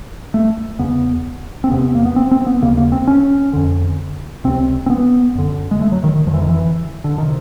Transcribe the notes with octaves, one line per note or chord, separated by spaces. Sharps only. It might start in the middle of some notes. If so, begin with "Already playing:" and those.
A3
E2 C#3 B3
C4
E2 C3 B3
A#3
B3
C4
C4
B3
D#2 C#3 A#3
A#3
C4
C#4
F2 D3
C#2 C3 C4
C4
B3
F#2 D3
G#3
A3
F#3
D#3
D#3
F2 D3 E3 F3
D#3
E3
D3
D#3
C3